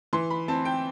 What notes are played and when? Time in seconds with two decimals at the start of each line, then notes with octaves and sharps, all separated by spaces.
0.13 E3 C6
0.30 B5
0.48 C4 A5
0.65 G5